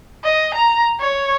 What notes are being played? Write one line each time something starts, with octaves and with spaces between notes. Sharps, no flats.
D#5
A#5
C#5